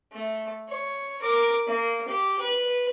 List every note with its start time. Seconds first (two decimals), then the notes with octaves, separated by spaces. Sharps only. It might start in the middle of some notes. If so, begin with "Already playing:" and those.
0.13 A3
0.69 C#5
1.21 A#4 D6
1.67 A#3
2.08 G4
2.39 B4